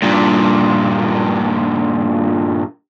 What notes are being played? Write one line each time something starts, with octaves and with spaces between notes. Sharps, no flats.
G2 A#2